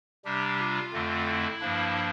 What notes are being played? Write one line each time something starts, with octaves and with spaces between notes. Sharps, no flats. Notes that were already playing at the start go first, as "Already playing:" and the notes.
C3 G3 D4 G4
F4
F2 D3 A3 C4
E4
G2 F3 A#3 D4